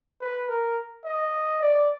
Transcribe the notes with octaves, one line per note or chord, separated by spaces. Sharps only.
B4
A#4
D#5
D5